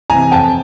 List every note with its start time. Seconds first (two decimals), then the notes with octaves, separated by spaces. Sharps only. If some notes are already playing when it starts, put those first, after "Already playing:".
0.10 C3 E3 G#5 A#5
0.32 F2 G5 A5